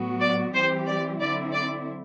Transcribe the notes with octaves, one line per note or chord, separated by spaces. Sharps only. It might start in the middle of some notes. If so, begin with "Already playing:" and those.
Already playing: A2 F#3 B3 F#4
D5
E3 G3 C4 G4 C5
D5
D3 F#3 C4 E4 D5
D5